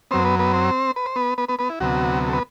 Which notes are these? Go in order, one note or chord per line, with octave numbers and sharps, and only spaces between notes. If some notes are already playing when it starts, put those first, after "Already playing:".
F#2 F#3 B3 C4 C5
B3 B4
B3 B4
C4 C5
B4
C5
B3 B4
B3 B4
B3 B4
B3 B4
E4
D2 C3 F#3 B3 F#4
A4
B3 B4